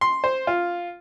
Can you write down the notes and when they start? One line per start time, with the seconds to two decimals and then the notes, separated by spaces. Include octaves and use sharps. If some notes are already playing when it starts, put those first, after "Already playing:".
0.01 C6
0.24 C5
0.47 F4